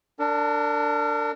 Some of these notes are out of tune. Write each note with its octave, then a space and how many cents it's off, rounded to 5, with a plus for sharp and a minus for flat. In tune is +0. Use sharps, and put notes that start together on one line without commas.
D4 +0 A#4 -40